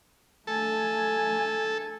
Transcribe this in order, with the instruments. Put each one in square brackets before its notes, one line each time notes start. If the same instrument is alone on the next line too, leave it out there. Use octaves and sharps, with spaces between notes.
[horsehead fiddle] A3 G#5 [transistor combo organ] A4